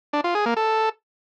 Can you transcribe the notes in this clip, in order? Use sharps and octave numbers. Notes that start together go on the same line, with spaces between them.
D4
F4
G#4
A#3
A4